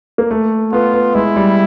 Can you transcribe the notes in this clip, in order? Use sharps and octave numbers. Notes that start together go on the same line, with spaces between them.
A#3
A3
B3 F4
B3
G#3 E4
G3